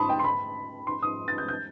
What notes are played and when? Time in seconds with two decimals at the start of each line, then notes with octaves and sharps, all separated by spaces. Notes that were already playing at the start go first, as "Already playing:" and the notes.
Already playing: A5 B5 C6 D#6
0.09 G5
0.19 C6
0.24 B5
0.87 C6
1.02 D#6
1.28 A6
1.38 G6
1.48 G6